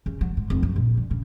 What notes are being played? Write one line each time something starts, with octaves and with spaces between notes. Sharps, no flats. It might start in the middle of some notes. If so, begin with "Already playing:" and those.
C#3
F#3
G#2
F1
F#2
A#1
D3
C#3